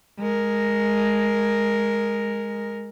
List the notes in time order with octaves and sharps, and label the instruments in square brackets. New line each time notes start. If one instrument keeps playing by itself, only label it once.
[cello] G#3 A#4